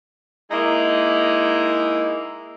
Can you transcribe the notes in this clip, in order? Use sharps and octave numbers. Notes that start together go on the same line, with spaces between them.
G#3 A#3 D#4 E4